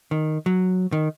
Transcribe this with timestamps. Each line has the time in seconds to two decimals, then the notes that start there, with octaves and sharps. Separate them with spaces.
0.11 D#3
0.46 F#3
0.92 D#3